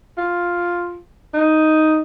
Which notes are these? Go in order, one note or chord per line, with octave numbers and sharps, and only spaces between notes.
F4
D#4